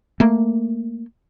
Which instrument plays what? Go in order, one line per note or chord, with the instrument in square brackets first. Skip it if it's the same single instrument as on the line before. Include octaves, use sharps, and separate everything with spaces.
[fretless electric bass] A3 A#3